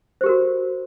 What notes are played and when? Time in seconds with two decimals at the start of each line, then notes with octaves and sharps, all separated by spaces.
0.21 C5
0.24 G4
0.26 A#4
0.29 F#4